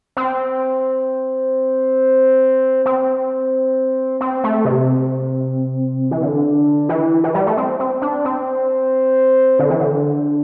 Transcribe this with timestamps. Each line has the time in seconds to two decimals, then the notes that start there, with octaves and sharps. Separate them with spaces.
0.17 C4
2.86 C4
4.21 C4
4.44 A3
4.65 C3
6.11 E3
6.22 D3
6.89 E3
7.24 E3
7.35 G3
7.47 A3
7.57 C4
7.79 C4
8.02 D4
8.25 C4
9.59 D3
9.70 E3
9.80 D3